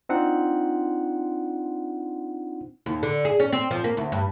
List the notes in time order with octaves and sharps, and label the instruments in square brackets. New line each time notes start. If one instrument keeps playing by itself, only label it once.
[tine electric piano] C4 D4 D#4 F4 F#5
[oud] D#2
D3
G#4
C#4
C4
F3
A#3
D2
G2